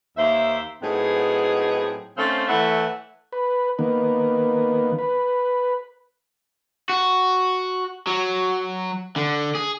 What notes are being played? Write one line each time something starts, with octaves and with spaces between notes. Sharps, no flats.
D#2 A#3 C5 E5
A2 F#3 B3 C4 D#4 G#4
D#3 A3 C4 C#4 C5 F5
E3 A3 E4 C#5 E5 F#5
B4
D#3 A#3 B3
B4
F#4
F#3
D3
G#4